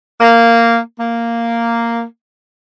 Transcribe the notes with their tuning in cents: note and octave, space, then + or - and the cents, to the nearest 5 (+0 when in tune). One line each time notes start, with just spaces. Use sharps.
A#3 -10
A#3 -5